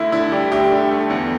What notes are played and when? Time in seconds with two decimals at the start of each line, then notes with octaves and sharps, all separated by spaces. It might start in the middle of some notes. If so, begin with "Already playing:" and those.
Already playing: D2 E4
0.12 D3 E4
0.32 G3 G4
0.52 D2 G4
0.71 D3
0.91 A3
1.10 E2